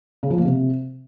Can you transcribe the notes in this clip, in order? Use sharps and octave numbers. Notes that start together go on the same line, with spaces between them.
C#3
F3
A#3
C3